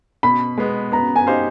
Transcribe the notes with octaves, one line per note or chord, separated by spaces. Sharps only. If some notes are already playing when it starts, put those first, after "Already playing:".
B2 B5
G#3 B3
B3 A#5
G#5
D#4 G4 C5 F5